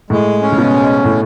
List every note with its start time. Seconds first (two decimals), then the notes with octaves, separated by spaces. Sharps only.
0.10 A2 G#3
0.42 C#4
0.52 C#3
0.58 B2
0.74 G#2
1.04 A2